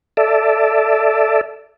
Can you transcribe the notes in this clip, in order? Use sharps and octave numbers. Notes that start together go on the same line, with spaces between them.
A4 D5 E5